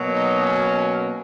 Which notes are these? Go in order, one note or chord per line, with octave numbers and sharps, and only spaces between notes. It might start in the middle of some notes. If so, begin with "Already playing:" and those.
Already playing: B2 F#3 A#3
D#4
C#4